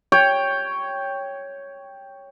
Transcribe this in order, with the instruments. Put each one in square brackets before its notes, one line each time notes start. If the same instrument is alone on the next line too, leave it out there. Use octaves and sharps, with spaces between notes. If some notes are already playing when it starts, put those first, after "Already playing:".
[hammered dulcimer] C#5 G5